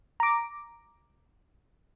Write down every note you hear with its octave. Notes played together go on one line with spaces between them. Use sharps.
A#5 D6